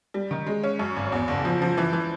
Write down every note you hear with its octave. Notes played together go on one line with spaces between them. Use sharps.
G3
D#3
G#3
C#4
F#2
G#1
E2
F#1
F3
F3
E3
E3